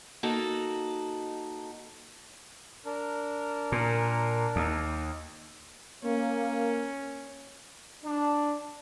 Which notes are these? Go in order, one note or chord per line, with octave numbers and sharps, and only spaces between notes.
A#3 D#4 F#4 A4
D4 A#4
A#2
D#2
A#3 C#4
D4